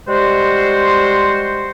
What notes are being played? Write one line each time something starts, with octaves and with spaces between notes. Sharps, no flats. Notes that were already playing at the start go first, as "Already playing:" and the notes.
G3 G#3 F#4 C5